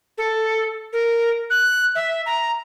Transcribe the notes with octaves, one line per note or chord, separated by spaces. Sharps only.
A4
A#4
F#6
E5
A#5